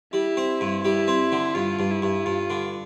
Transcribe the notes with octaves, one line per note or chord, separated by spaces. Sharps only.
G3 E4
C4
G2
G3 E4
C4
D3
G2 F4
G2
E4
G2
G2 F4
D3